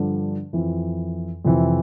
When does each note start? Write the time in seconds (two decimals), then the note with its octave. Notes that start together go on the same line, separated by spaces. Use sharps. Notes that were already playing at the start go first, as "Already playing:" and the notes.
Already playing: G2 D3 F3
0.53 F2 E3
1.45 F2 C3 E3